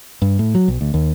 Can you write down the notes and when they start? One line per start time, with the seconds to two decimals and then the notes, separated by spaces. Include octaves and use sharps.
0.22 G2
0.39 A2
0.55 F#3
0.68 B1
0.81 D2
0.94 D#2